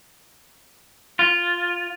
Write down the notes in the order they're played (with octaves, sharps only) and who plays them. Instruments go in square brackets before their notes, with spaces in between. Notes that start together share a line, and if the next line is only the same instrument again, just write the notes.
[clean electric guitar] F4